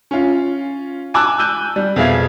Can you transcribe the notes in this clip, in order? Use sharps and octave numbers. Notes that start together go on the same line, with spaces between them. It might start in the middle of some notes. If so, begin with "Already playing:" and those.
C#4 F4
G#5 A5 D6 E6 F#6
E6 F#6 G6 D#7
G3
F2 B2 G#4 E5 F5 G#6